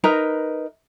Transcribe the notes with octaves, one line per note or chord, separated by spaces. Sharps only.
D#4 A#4 B4 A#5